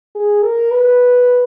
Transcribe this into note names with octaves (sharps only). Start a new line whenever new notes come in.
G#4
A#4
B4